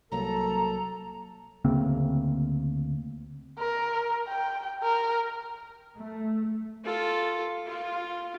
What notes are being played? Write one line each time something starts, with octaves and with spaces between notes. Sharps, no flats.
C2 F#3 A#3 A4 A#5
D2 C#3 A#3 C4
A#4
G5
A#4
A3
F4 A4
F4